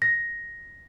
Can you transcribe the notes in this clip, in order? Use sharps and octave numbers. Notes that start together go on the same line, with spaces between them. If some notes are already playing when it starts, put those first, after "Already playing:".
A#6